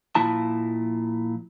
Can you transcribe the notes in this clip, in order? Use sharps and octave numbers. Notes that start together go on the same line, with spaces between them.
A#2 F3 E4 A5